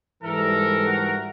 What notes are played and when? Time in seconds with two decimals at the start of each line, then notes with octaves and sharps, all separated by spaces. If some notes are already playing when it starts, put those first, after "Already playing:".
0.23 G#2 E3 G3 A4 A#4
0.86 F#4